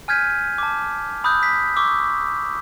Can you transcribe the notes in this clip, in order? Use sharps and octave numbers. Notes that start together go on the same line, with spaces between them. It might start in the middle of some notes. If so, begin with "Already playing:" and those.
G#5 F6 G6 G#6 B6 D#7
A5 D6
B5 D#6 E6 F#6 G6
B6
C#6 D6 E6